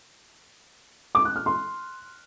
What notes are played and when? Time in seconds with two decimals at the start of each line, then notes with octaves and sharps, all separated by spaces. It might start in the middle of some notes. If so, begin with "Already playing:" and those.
1.15 D6
1.25 F#6
1.36 F6
1.46 C6